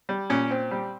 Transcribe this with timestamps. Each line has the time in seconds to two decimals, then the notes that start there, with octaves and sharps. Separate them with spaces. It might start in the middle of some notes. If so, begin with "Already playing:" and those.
0.09 G3
0.30 A#2 C#4 C#5
0.51 C4
0.71 G3